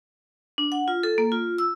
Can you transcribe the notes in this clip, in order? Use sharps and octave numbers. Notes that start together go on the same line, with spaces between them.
D4
F#5
F4
A4
A#3
F4
E6